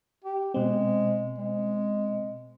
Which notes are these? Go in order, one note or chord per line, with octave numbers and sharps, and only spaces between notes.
G4
B2 G#3 C4
G#3